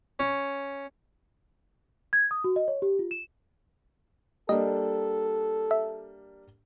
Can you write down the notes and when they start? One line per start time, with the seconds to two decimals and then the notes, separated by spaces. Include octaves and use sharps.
0.19 C#4
2.13 G#6
2.31 D#6
2.44 F#4
2.56 D#5
2.68 C#5
2.82 G4
2.99 F4
3.11 E7
4.49 G3 A#3 D4 A4 D#5
5.71 E5